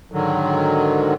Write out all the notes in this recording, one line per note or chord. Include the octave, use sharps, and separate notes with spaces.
G#2 D3 D#3 F#3